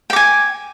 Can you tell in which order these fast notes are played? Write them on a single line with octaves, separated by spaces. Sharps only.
G5 D6 G#5